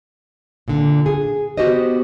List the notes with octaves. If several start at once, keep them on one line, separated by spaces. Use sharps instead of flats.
A#2 D3
G#4
B3 F#4 G4 C5 D#5